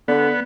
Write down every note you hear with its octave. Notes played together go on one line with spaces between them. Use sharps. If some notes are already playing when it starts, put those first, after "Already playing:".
D3 B3